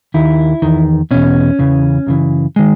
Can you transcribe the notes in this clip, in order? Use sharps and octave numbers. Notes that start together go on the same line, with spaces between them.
D#2 D#3 E4
E2 D#3
E2 B2 C#4
E2 C#3 E3
F#2 C#3 E3
D#3 G#3